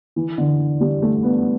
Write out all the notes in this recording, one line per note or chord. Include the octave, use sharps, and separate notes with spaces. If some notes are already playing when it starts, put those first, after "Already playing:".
E3
D3
G3
A3
B3